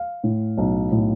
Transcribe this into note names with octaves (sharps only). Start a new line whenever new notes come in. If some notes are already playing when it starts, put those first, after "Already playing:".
Already playing: F5
A2
B1
A2